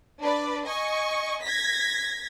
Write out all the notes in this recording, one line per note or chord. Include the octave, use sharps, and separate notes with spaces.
D4 B4 D5
D#5 G#5 C#6
G#6 A#6 B6